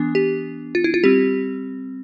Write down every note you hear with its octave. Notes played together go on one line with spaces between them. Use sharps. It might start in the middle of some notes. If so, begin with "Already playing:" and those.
Already playing: E3 B3 D4
G4
F4
E4
F4
G3 C4 G4